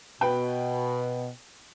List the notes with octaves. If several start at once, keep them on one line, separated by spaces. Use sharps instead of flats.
B2 B4 G5